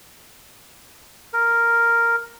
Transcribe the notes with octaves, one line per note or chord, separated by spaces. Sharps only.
A#4